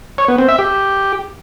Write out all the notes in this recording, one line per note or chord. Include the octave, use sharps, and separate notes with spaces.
C#5
B3
C4
E5
G4